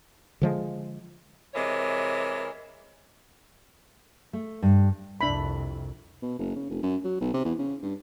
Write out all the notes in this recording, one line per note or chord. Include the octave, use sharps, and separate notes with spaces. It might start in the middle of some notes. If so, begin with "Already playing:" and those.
D3 F3 G#3
C3 E3 G#3 A#4 C#5
A3
G2
C2 F2 D4 E5 B5
B2
F#1
C#3
F1
F#2
F#3
B1
C3
E2
C#3
G2